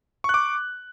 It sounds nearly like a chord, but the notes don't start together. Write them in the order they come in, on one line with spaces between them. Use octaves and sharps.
C#6 F#6 D6